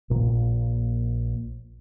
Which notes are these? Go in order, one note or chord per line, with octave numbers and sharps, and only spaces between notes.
A#1 A#2 A#3